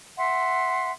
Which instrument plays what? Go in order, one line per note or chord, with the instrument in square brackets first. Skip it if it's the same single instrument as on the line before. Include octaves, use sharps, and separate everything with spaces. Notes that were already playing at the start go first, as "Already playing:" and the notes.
[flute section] E5 F#5 C6